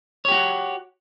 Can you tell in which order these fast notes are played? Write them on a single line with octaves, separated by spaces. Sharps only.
C#5 G4 F#4